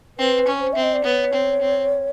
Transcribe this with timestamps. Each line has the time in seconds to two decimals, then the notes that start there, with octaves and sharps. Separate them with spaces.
0.18 C4 B4
0.47 C#4
0.60 C5
0.73 C4 E5
0.83 D#5
0.94 D5
1.04 B3 C#5
1.33 C4
1.61 C4